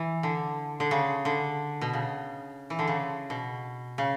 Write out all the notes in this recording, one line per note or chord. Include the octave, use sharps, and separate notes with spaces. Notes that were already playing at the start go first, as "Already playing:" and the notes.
Already playing: E3
D3
D3
C#3
D3
B2
C#3
E3
D3
C#3
B2
C#3